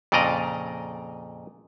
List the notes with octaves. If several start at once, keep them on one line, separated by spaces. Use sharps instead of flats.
F2 A#2 C#3 D5 D#5 A#5